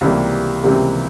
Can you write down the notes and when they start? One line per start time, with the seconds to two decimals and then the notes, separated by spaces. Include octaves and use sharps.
0.01 C#2 C3 E3 G3 A#3
0.63 C#2 C3 E3 G3 A#3